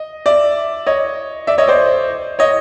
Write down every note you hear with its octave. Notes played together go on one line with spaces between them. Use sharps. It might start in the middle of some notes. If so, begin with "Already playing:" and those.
Already playing: D#5
D5 E5
C#5 D#5
D5 E5
C#5 D#5
C5 D5
C#5 D#5